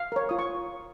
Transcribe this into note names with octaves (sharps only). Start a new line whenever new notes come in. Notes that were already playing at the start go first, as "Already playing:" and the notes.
Already playing: F5
A#4 C#5
F4 D#6
C#6